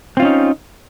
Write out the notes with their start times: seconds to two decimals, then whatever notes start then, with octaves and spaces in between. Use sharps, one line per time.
0.17 C4
0.20 F4
0.22 C#4
0.25 D#4